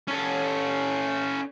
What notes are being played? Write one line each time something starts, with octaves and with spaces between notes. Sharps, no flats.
C#4 A4